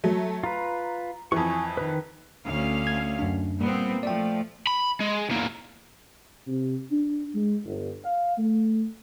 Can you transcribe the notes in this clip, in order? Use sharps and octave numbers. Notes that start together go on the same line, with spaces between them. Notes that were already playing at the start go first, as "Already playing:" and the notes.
F#3 A3
F4 B4 A#5
F2 E3 G#5 C#6
D#3 B4
D2 C#4 F5
G#6
F#2 D4
A#2 G3 B3 C4
F3 A3 D5 G5
B5
G#3
E2 A#3
C3
D4
G#3
G1
F5
A3